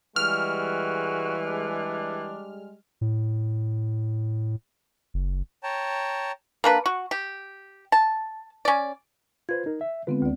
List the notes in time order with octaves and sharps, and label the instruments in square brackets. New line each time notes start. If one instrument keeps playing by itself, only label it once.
[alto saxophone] E3 [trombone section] G3 G#3 [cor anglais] F#4 [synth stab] F6
[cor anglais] D4
[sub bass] A2
F#1
[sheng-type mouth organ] C#5 G5 A5 A#5
[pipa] A#3 D4 B4
F#4
G4
A5
C#4 D5
[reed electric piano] F4 B4 C5 [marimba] G#6
[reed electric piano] D#4 A#4
E5
[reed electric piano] D3 F4 B4 [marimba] G#3 B3 C4
[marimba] D2 D5